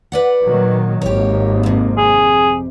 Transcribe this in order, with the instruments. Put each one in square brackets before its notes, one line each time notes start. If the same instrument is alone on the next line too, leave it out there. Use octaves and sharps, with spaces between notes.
[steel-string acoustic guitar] B4 D5 F#5
[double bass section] A#2 D#3 F#3
[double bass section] G#1 A#3 [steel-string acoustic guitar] G4 C#5
[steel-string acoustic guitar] F2 C3
[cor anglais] G#4